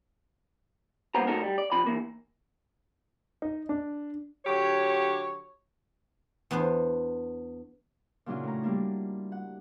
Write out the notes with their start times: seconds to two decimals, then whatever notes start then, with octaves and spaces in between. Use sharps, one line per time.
1.15 C#2 G2 A#3 B3 C5 A#5
1.27 A2 F#3 D#4 A4 A#4
1.44 G3
1.58 D5
1.72 C3 F3 B5
1.86 E3 A#3
3.42 D#4
3.69 D4
4.45 D3 F#3 G4 C#5
6.51 E2 B3 D4 C5
8.26 A#2 C#3 F#3 D4 E4 F4
8.44 A2 A#5
8.63 G3 A#3 D4
9.32 F#5